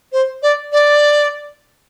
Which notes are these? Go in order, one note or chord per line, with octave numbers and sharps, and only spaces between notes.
C5
D5
D5